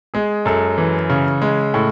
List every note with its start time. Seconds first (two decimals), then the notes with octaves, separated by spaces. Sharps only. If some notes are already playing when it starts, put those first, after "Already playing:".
0.14 G#3 G#4
0.45 F#2 A4
0.78 E3
1.10 C#3
1.42 G#3
1.74 A2